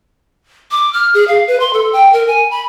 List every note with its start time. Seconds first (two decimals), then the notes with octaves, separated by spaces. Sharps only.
0.71 D6
0.93 F6
1.14 G#4
1.28 F5
1.48 B4
1.60 C6
1.73 A4
1.93 G5
2.13 A#4
2.27 G#5
2.51 B5